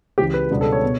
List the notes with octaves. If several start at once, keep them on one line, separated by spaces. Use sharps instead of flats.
C#2 C#3 E3 G4
B4
C#2 B2 G3 B3 D4
A4
C#5
B2